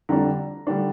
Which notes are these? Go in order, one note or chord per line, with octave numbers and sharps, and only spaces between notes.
F2 D3 G3 D4 A#5
D3 G3 D4